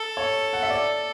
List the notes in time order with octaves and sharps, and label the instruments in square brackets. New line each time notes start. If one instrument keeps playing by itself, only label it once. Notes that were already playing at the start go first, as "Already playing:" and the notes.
Already playing: [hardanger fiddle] A4
[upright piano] C#5
F#5
E5
D5